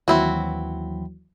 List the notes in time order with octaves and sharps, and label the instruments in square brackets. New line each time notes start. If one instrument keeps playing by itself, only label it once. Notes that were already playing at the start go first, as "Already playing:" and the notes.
[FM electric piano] D#2 E3 F#3 [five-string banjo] C4 E4 F#4